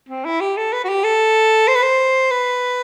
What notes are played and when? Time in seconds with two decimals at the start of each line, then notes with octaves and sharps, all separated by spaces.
0.09 C4
0.25 E4
0.41 G4
0.57 A4
0.73 B4
0.85 F#4
0.89 G4
1.04 A4
1.68 C5
1.75 B4
1.83 C5
2.31 B4